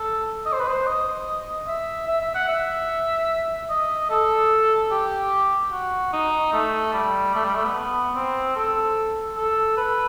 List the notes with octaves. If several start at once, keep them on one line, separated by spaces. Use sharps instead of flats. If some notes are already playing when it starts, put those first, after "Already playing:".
Already playing: A4
D#5
C5
B4
C5
D#5
E5
E5
E5
F#5
E5
D#5
A4
G4
F#4
D#4
A3
G3
A3
G3
A3
B3
C4
A4
A4
B4